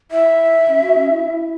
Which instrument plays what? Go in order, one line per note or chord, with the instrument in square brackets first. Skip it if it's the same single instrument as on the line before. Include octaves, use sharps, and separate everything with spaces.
[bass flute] E4 [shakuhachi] E5
[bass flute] C#4
F#4
C#4
E4
E4